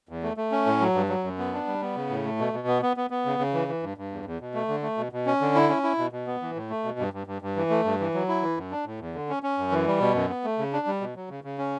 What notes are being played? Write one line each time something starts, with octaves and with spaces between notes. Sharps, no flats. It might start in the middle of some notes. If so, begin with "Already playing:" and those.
E2
A3
A3
C#4
A2
F#3
G2
F#3
F#2
B3
D4
G3
B3
C#3
A2
A3
B2
B2
B3
B3
B3
B3
C#3
C#3
E3
E3
G2
G2
E2
E2
B2
A3
D3
A3
B2
B2
C#4
D3
E4
C#4
E4
B2
B2
B3
E3
A2
A3
B2
G2
G2
G2
G2
E3
A3
G2
E3
F#3
E4
E3
F#2
D4
A2
E2
D3
C#4
C#4
F#2
E3
G3
B2
F#2
B3
A3
C#3
D4
G3
B2
F#3
C#3
C#3
C#4